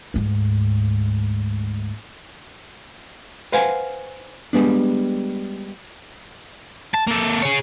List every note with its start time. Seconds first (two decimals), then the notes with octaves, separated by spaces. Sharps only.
0.14 D2 G#2
3.52 B4 C5 F5 F#5 G#5
4.53 G3 G#3 B3 D4
6.94 A5
7.08 A#3 A4
7.42 G#4 C#5